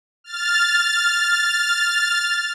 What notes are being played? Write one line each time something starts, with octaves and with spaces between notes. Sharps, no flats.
F6 A6